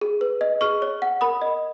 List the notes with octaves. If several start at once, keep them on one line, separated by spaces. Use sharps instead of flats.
G#4
B4
D#5
G#4 C#6 F6
C#5
F#5
A#4 B5 D#6
D#5